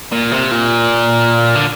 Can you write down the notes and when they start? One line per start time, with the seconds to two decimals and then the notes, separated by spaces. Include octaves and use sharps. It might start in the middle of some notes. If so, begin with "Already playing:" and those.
0.12 A#2
0.32 C3
0.51 A#2
1.55 D3